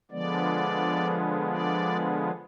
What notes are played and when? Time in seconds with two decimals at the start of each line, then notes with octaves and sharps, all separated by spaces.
0.11 D3 F3 G#3 B3 D5
1.49 D5